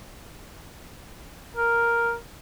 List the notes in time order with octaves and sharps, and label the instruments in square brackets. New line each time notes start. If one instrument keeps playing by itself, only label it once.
[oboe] A#4